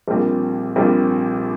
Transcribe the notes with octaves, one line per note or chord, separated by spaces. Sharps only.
A#1 A#2 G3 C4 F4
A#1 A#2 G3 C4 F4